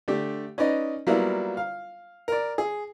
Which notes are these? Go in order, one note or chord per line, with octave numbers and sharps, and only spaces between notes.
D3 A3 G4
C#4 D#4 B4 D5 D#5
F#3 G3 A#3 B3 E4 F4
F5
A#4 D5
G#4